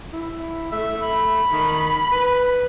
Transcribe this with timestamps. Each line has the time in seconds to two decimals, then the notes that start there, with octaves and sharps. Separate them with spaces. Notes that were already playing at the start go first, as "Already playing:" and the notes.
0.13 E4
0.72 A3 E5
1.02 B5
1.52 D#3
2.12 B4